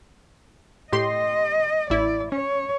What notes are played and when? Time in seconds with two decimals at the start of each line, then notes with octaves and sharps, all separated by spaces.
0.93 A2 G4 D#5 C6
1.90 A1 E4 D5
2.32 C#4 C#5